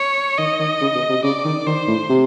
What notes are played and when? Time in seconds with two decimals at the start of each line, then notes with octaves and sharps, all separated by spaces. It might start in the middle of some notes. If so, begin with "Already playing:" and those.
Already playing: C#5
0.38 D#3 D#5
0.60 D#3
0.81 C#3
0.95 B2
1.10 C3
1.24 C#3 D5
1.45 D#3
1.67 D#3 C5
1.88 A2
2.10 C3